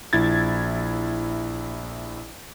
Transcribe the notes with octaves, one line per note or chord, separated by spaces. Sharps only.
A#1 E4 G#6 A6